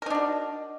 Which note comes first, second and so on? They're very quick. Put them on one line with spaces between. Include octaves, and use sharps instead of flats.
A#4 D#4 D4 F#4